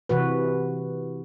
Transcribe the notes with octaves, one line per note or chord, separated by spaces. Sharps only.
C3 E3 F#4 B4